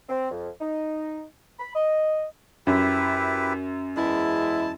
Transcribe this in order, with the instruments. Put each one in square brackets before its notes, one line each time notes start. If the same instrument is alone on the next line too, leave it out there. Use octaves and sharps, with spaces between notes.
[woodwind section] C4
F2
D#4
B5
D#5
[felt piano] F#2 [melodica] E4 G4 B4
[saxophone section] E2 G#3 E4 [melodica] A5